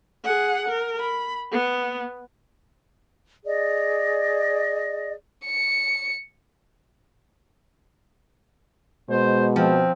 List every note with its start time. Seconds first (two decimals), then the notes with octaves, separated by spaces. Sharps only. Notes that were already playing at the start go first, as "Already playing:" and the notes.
0.24 G#4 F#5
0.69 A#4
1.00 B5
1.52 B3
3.45 G#4 D5 D#5
5.46 C#7
9.09 B2 G#3 C5
9.56 F3 C4